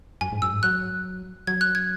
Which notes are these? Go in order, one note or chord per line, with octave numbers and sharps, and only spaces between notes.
F#2 G#5
G#2
F#2 E6
G#2
F#3 F#6
F#3 G#6
F#6
G#6